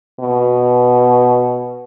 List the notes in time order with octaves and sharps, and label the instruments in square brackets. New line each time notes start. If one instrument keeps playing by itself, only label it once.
[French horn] B2